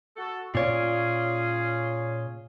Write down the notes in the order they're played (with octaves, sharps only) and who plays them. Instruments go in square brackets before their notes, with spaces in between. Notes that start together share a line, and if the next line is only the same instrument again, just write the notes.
[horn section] F#4 A4
[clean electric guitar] A#2 C#5 D5 [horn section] C#4 F4 G#4